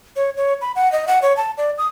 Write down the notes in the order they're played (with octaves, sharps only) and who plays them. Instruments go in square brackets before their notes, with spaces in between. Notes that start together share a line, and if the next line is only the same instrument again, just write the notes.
[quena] C#5
C#5
B5
F#5
D#5
F#5
C#5
A5
D5
D#6